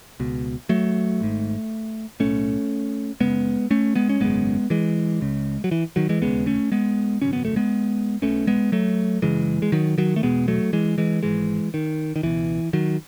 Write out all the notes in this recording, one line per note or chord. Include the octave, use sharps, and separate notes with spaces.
C#2 B2
F#3 A3
G#1 G#2
B1 A2 A3 C#4
F#1 F#2 C#3 G#3 B3
A3 C#4
G#3 B3
C#4
G#1 F#2 C#3 G#3 B3
E3 G#3
C#2 C#3
F#3
E3
D#3 F#3
E3 G#3
E1 D#2 C#3 G#3 B3
A3 C#4
G#3 B3
G#1 F#2 C#3 C#4
B3
A3
G#3 B3
B1 B2 A3 C#4
G#3 B3
F#3 A3
F#1 F#2 C#3 E3 G#3
G#3
D#3 F#3
D#3 F#3
A3
E1 E2 B2 G#3 B3
F#3 A3
E3 G#3
E3 G#3
G#1 G#2 E3 G#3
D#3
D#3
C#2 B2 E3
D#3 F#3